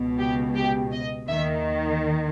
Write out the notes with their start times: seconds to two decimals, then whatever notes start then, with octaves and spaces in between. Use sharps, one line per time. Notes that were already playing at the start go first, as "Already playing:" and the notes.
Already playing: C#2 B2
0.19 G4
0.55 G4
0.92 D#5
1.28 D#2 D#3 E5